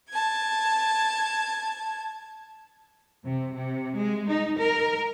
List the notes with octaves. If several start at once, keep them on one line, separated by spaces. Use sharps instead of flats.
A5 G#6
C3
C3
G#3
D#4
A#4